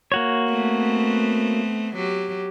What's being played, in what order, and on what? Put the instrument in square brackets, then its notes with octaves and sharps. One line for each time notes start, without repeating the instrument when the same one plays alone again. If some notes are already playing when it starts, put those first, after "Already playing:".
[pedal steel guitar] A#3 F#4 C#5
[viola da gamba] A3 B3 C4
F#3 G4